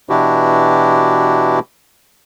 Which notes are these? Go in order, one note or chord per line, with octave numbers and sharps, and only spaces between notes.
B2 E3 D4 E4 F#4 G4